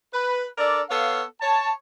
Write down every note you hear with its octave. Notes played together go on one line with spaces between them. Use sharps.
B4
D4 A4 A#4 D5
B3 A4 C#5 F5
C#5 A5